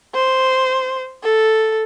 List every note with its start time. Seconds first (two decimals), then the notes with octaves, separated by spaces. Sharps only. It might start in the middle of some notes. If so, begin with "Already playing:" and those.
0.15 C5
1.23 A4